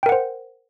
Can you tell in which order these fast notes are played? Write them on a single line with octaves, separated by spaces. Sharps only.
G5 A#4 F#5 C5